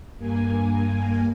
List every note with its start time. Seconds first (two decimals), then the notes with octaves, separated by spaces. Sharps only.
0.17 G2 A#3 G#5